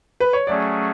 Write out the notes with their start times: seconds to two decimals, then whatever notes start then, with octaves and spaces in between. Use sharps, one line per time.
0.20 B4
0.33 C#5
0.47 F#3 A3 C#4 G#4 D5